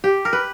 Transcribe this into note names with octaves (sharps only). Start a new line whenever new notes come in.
G4
A#4
B4